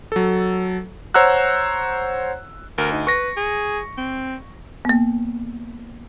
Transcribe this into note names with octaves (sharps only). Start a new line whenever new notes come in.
F#3 A4
C5 C#5 F#5 A#5 E6 F#6
D2 A#4
D#4
B4 C#6 A#6
G#4
C4
A#3 B3